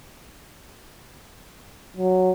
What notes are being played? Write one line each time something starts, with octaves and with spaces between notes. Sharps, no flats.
F#3